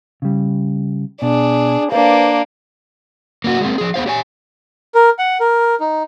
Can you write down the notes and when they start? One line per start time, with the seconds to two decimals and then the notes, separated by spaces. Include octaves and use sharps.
0.22 C#3 G3
1.22 B2 D4 G#4
1.92 A#3 D4 B4 C5 F5
3.44 A#3 C#4 F#4
3.61 G#3 A#3 C4
3.78 F3 G#4
3.94 B3 C#4 C5 F5
4.06 G4 C#5 G#5
4.95 A#4
5.19 F#5
5.40 A#4
5.80 D#4